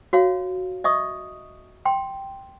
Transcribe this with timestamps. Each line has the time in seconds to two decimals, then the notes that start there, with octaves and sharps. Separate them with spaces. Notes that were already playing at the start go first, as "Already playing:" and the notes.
0.13 F#4 C#5 F5
0.84 D#5 E5 C#6 D#6
1.85 G5 C6